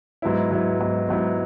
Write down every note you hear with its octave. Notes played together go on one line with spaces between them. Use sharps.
G#2 F#3 B3 E4
G#2 F#3 B3 E4
G#2 F#3 B3 E4
G#2 F#3 B3 E4